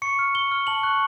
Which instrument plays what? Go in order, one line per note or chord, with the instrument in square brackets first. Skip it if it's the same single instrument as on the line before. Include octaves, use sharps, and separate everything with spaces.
[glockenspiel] C#6 C#7
F6
C#6 G7
F6
A5 F#7
C#6 F#6